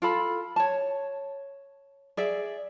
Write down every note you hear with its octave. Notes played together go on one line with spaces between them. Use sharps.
F4 A4 B5
C#5 A5
G#4 D5 E5